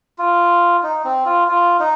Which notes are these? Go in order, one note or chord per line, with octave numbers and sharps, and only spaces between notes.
F4
D#4
C4
F4
F4
D#4